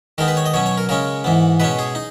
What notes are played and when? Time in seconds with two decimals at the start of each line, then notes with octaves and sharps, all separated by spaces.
0.18 D#3 G#3 B3 D#4 A#4
0.28 B4
0.37 C#5
0.46 D#5
0.54 B2 F#3 C#4 C#5
0.66 C#5
0.78 A#4
0.89 C#3 G#3 C#4 A#4
1.24 G#2 E3 B3
1.60 B2 G#3 C#4 B4
1.79 G#4
1.95 D#4